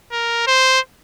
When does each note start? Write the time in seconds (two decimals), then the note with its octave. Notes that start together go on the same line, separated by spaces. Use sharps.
0.12 A#4
0.47 C5